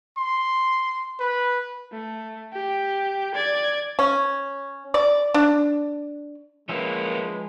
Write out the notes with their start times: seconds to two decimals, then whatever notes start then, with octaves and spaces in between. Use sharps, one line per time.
0.18 C6
1.20 B4
1.92 A3
2.53 G4
3.35 D5 G#6
3.99 C#4
4.94 D5
5.34 D4
6.69 F3 G#3 A#3 C#4 B4 E5